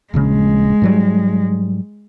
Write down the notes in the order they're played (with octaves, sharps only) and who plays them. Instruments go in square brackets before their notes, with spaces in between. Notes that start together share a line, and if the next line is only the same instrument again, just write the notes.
[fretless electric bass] D#1 A#1 C#3 [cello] G#3
[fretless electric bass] G#2 F#3 G3